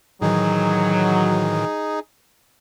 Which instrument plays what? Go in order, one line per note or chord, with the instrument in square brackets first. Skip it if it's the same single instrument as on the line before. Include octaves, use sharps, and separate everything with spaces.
[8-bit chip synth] A2 D#3 E3 [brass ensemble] F#3 [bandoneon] D#4 G#4